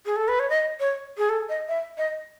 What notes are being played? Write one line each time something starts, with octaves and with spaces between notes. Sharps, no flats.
G#4
A4
B4
C#5
D#5
C#5
G#4
A4
D#5
E5
D#5